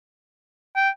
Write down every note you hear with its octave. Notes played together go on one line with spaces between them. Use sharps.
G5